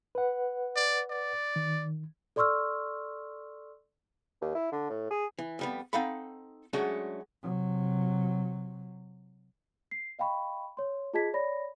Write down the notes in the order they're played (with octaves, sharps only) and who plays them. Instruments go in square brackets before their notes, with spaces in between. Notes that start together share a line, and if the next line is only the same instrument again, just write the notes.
[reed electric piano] B4 F#5
[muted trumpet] D5
D5
[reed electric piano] D#3
[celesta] A4 D5 C6 C#6 E6 F6
[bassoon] D#2
E4
D3
A2
G#4
[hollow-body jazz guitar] E3
F2 G3 B3
C4 D#4 A4 F5 F#5 B5
F#3 G#3 A3 C#4 D4 F#4
[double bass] C3 F#3
[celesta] C7
D#5 F5 G5 B5 C#6
C#5 C6
F4 G#4 D#5 A5 G#6 B6
C#5 D5 B5 A#6